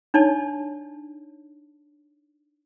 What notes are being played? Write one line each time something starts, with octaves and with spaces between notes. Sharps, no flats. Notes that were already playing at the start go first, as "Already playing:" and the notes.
D4 D#4 C#5 D5 A5